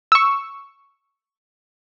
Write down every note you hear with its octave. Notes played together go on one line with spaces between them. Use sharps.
C#6 E6